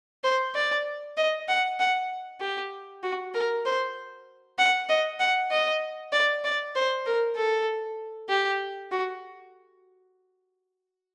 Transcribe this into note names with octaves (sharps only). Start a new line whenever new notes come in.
C5
D5
D#5
F#5
F#5
G4
F#4
A#4
C5
F#5
D#5
F#5
D#5
D5
D5
C5
A#4
A4
G4
F#4